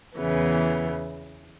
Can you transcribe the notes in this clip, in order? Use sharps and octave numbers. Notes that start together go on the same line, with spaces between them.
E2 C#3 E3 B3